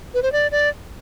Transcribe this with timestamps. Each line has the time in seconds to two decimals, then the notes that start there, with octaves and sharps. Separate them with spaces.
0.14 B4
0.23 C5
0.32 D5
0.51 D5